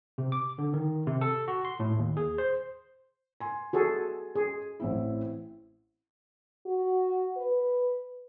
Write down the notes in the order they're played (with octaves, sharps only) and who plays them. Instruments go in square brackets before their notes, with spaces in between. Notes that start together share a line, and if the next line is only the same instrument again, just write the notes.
[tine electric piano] C3
D6
D3
D#3
C3
A4
F#4
C6
A2
D#2
G#4
C5
[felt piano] G#5 C6
[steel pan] F#4 G#4 A4
G#4
[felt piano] A1 C4 E4
[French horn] F#4
B4